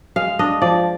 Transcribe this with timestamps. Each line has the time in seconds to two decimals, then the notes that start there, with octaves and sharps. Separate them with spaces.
0.16 G#3 F5
0.39 D4 D#5
0.62 F3 D5